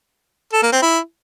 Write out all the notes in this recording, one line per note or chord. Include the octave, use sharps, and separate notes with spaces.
A4
A#3
C4
E4